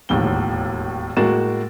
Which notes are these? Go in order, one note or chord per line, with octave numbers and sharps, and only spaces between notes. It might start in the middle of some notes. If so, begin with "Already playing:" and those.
E1 A#1 D#2 A2 G7
A2 G#3 A#3 F#4 A6 E7